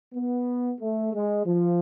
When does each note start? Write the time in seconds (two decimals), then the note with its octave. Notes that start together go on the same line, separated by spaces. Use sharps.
0.14 B3
0.81 A3
1.13 G#3
1.46 F3